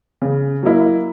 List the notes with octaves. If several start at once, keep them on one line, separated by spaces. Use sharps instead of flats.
C#3
F#3 A#3 E4